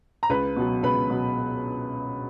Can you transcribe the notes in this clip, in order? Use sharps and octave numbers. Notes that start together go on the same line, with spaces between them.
A#5
C#2 B4 B5
B2 F#3
C#2 B4 B5
B2 F#3